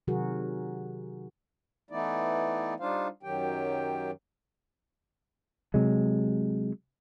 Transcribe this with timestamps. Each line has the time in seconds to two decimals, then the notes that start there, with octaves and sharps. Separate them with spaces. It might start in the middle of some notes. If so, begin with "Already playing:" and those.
0.07 C3 D#3 F#3 F#4 G#4 A#4
1.91 E3 A3 B3 D#4 E4 D5
2.80 G3 D4 D#4 F4 C5 F5
3.23 F#2 D#3 F#3 G4 G5
5.74 C3 F#3 G#3